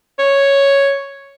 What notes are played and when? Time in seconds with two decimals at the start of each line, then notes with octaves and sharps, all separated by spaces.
0.19 C#5